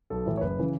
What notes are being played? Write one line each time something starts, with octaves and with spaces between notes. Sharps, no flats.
B1 A4
A2 E3
C#5
F#1 B4
C#3 E3